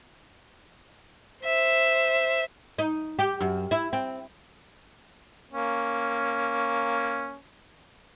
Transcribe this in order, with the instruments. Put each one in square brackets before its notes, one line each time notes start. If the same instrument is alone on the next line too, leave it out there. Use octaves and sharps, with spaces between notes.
[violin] C5 E5
[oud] D#4
G4
F#2
E4
C4
[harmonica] A#3 C#4